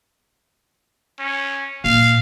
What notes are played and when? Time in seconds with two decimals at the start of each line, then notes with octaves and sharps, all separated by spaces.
1.19 C#4
1.84 A#2 E3 F5